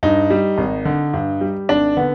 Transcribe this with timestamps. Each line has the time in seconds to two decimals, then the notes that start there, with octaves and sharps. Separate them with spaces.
0.03 G2 D#4
0.30 G3
0.58 G#1
0.85 D3
1.14 G2
1.41 G3
1.69 G#1 D4
1.97 D3 B3